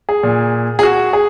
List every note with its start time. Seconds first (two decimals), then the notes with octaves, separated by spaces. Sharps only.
0.09 G#4
0.23 A#2
0.79 G#4
0.83 F#4
1.13 G#4